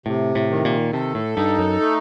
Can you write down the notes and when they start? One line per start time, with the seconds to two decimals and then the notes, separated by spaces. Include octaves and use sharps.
0.06 A2 C3
0.35 A2
0.50 D#3
0.65 A#2
0.93 C3 A4
1.15 A2
1.37 G2 D#4
1.59 F#2
1.80 A3